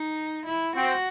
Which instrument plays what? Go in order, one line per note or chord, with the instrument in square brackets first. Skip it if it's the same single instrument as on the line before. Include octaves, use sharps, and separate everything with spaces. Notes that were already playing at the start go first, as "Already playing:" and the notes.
Already playing: [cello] D#4
E4
[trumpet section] C4 [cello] F#4